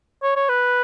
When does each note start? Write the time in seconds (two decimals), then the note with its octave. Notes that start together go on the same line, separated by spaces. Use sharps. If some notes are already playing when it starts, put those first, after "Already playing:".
0.23 C#5
0.36 C#5
0.49 B4